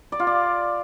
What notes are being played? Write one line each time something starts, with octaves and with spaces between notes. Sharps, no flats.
D5
F4
D5